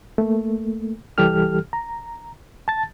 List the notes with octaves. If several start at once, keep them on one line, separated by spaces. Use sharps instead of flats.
A3 A#3
C2 E3 G3 G4 A4 F6
A#5
A5 A6